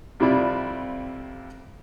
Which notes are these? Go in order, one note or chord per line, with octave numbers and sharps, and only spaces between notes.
F2 C3 G3 E4 F4 D5